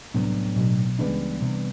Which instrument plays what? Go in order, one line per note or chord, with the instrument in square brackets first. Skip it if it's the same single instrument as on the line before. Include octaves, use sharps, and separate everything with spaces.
[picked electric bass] C2 C3 [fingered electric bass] A2 F#3 B3 D4
[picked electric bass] B1 B2
[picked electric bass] C#2 C#3 [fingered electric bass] E3 G3 B3 D4
[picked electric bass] C2 C3